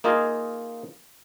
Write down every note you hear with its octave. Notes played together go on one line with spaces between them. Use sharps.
A#3 D#4 F4 G#4 D#5 G#5